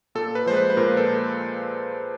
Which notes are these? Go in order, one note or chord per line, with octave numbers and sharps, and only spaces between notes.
A#2 A4
B4
F3 G#3 C5
B4
B4
A#2 A#4
A4